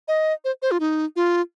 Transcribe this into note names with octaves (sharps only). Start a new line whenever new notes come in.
D#5
C5
C5
F4
D#4
F4